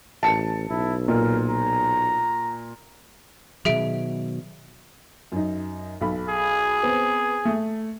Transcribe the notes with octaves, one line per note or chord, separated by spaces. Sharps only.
A1 A5 C#7
B1 E4
A#2 A#4
A#5
B2 D#3 F#3 G#4 E5 D7
F#2 D#4
B1 A4 B5
G#4
B3 C4
A3